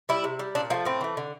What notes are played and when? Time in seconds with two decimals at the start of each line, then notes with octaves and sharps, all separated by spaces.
0.09 G3 E4
0.24 C3
0.39 G3
0.55 A#2 D4
0.70 F3 A#3
0.74 A3
0.85 A2 C4
1.01 E3 A3
1.17 D3